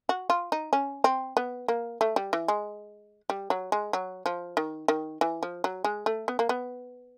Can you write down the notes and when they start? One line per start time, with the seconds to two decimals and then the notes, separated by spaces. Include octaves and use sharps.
0.09 F#4
0.30 F4
0.52 D#4
0.73 C#4
1.04 C4
1.37 B3
1.68 A#3
2.01 A3
2.16 G3
2.33 E3
2.48 G#3
3.30 G3
3.50 F#3
3.72 G#3
3.93 F#3
4.26 F3
4.57 D#3
4.88 D#3
5.21 E3
5.43 F3
5.64 F#3
5.84 G#3
6.06 A3
6.28 B3
6.39 A#3
6.49 B3